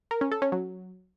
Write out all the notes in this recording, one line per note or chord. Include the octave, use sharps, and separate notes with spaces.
A#4
C#4
A4
C#4
F#3